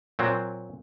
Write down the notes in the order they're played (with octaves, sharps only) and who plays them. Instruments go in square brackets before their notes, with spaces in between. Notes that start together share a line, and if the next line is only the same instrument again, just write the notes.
[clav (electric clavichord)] A#2 F#3 C4